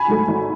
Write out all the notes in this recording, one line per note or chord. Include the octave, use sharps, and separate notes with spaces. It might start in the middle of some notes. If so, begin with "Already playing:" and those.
Already playing: G#5 B5
G#2 F#3 A3
G#1